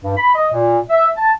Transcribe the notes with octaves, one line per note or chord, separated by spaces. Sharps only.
G2
B5
D#5
A#2
E5
A5